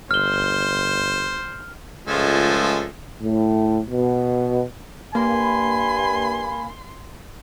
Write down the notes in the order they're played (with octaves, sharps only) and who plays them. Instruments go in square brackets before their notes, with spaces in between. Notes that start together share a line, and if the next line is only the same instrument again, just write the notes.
[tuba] G1 [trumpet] C5 [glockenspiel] F6 G7
[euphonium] C#2 [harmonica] F3 G#3 A3
[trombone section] A2
B2
[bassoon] G2 [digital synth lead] A#3 [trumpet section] G#5 B5 [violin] C6